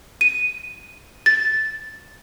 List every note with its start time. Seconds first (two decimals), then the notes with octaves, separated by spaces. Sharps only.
0.21 D#7
1.26 A6